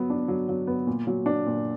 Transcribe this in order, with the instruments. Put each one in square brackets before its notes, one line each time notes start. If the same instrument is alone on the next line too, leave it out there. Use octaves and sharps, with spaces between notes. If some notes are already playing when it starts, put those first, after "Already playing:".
Already playing: [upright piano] F#3 B3
D4
F#3
F#3
B3
A#2
F#3
D4
A#2